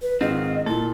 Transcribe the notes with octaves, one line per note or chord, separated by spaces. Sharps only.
B4
G#2 D#3 C4 F4 D#5
A#2 E4 A4